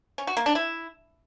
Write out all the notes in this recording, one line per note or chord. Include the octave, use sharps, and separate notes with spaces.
C#4
F#4
A#3
D4
E4